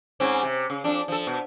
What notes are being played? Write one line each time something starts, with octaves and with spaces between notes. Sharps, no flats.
G#2 C4 C#4
C3
C#3
F2 D4
F3 A4
B2